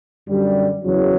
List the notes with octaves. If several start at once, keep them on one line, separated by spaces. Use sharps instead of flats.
F#2 D3 G3
E2 C#3 E3 F#3